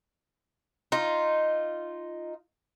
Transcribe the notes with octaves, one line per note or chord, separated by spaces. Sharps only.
D#4 F4